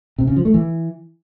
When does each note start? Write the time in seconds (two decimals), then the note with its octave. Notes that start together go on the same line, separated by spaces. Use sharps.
0.18 C3
0.27 C#3
0.36 F3
0.45 A3
0.54 E3